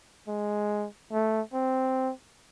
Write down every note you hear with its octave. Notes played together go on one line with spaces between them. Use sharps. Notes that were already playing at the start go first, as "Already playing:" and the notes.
G#3
A3
C4